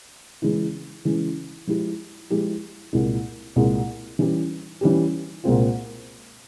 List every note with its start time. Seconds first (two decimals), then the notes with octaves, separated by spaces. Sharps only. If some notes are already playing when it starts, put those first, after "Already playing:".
0.42 C#3 E3 G#3 C#4 E4
1.05 C#3 E3 G#3 C#4 E4
1.67 F3 G#3 E4 G4
2.30 F3 G#3 E4 G4
2.93 C2 A#2 G#3 E4
3.56 C2 A#2 G#3 E4
4.19 E3 G3 C#4 G4
4.81 E3 G3 C#4 G4
5.44 C2 A#2 G#3 C4 F4